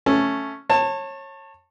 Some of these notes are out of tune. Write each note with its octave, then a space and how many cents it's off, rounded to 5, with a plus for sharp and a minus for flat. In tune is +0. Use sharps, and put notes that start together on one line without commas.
A3 +0 C#4 +0
C#5 -25 A5 +20